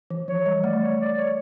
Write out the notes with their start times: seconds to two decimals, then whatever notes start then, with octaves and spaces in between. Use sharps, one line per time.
0.10 E3
0.28 F3 C#5
0.46 G3
0.63 A3 D5
0.81 C#5
1.00 D5
1.18 C#5